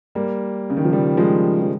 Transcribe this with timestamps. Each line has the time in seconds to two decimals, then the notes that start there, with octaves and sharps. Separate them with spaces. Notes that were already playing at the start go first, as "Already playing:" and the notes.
0.15 G3 A#3
0.70 C#3
0.77 D#3
0.85 F3
0.92 D#3 G3
1.17 F3 G#3
1.62 F3